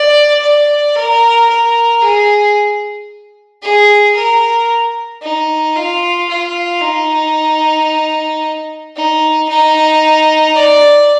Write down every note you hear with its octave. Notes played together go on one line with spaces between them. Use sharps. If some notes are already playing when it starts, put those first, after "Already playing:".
Already playing: D5
D5
A#4
A#4
G#4
G#4
A#4
D#4
F4
F4
D#4
D#4
D#4
D5